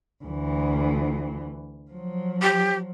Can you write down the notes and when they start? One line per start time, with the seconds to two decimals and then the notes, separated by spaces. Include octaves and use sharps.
0.24 D2 E3
1.92 F3 F#3
2.42 G4